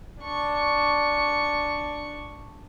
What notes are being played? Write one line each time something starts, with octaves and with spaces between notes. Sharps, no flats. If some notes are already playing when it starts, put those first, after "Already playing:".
D4 C#6